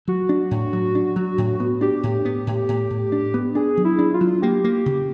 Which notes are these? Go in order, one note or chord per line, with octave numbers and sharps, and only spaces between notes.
F#3 F#4
D4
A2
F#3
D4
F#3
A2
B3
D4 G4
A2
B3
A2
A2
A2
D4
B3
D4 G#4
F#3
E4
D4
F4
F#3
A#3 G4
A#3
C#3